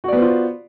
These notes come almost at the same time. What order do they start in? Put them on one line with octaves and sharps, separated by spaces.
F#4 D5 B3 C5 F4